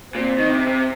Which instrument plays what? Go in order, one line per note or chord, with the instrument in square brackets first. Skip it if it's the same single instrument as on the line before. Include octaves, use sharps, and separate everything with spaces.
[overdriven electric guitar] A#2 [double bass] C4
[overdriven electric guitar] D#3
C3
C3